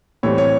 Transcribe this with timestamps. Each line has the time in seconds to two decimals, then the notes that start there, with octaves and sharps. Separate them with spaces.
0.23 A2 E3 G3 C4 C#5
0.38 C#5